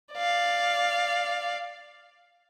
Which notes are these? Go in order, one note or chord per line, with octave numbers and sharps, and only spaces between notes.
D5 F5